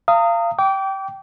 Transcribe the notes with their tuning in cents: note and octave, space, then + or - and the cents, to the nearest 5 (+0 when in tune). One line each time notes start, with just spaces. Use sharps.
F5 -25 A#5 -35 D#6 +0
G5 -15 D6 -30